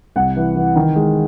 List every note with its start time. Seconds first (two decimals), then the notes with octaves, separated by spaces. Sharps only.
0.16 C2 F#5
0.36 E3
0.55 E3
0.76 D#3
0.96 G#3